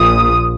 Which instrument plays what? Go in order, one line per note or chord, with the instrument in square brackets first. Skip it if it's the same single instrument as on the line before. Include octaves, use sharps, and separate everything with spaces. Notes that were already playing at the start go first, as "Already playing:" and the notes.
Already playing: [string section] A#1 A#2 D#6